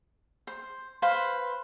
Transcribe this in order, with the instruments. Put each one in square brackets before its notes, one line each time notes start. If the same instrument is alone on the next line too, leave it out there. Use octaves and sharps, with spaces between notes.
[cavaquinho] C5
B4 C5 F5